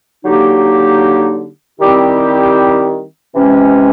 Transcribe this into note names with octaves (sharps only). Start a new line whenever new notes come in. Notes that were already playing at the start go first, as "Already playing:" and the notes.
D3 F#3 A#3 D#4 G4
D#3 G3 C4 E4 G4
C3 E3 G#3 C#4